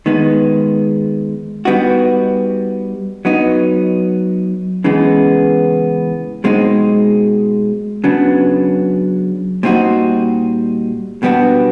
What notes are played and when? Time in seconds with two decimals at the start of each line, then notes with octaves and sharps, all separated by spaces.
0.06 D#3 G#3 B3 D#4
1.65 G3 B3 D#4 F#4
3.25 F#3 B3 D#4
4.84 C#3 E3 G#3 B3
6.44 B2 G#3 C4 D#4
8.04 C#3 F#3 B3 D4
9.63 A#2 G3 C4 D#4 F#4
11.23 B2 G3 B3 D4 F#4